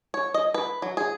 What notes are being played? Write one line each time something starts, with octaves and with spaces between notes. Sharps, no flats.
C#5
D#5
B4
F#3
G#4